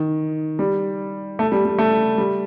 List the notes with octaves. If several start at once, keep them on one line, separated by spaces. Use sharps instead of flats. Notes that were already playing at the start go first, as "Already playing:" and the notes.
Already playing: D#3
G3
A3
G3
G3
A3
G3